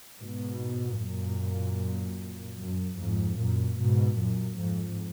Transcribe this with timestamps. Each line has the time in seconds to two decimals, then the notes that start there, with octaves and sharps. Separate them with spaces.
0.21 G#2 B2
1.01 F#2 A#2
2.61 F#2
3.01 F2 G#2
3.40 F#2 A#2
3.80 G#2 B2
4.20 F#2 A#2
4.60 F2 G#2